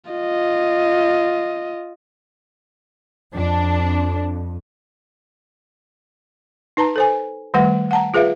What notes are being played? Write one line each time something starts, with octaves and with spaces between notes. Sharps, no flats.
F4 D#5
F2 D4
D#4 B4 A5 A#5
A4 C5 G#5
D#3 G3 A3 B4 F#5
F#5 A5 A#5
F4 G#4 B4 E5 F5